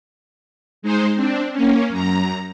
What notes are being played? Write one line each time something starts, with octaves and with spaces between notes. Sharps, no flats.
G#3 D#4 C5
C4 D4
A#3 C#4
F#2 A#5